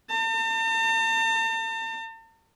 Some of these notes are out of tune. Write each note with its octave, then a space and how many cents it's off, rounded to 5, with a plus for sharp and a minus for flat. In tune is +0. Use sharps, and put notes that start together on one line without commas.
A5 +45